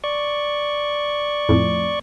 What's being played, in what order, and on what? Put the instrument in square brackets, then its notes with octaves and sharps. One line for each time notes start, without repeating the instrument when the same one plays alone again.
[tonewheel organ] D5 C#6
[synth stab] F2 A2